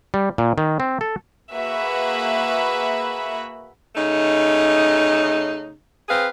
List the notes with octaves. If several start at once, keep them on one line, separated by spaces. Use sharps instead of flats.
G3
A#2
D#3
C4
A4
A#3 F#4 G#4 B4 E5 B5
C#3 A3 D#4
C4 G#4 B4 F5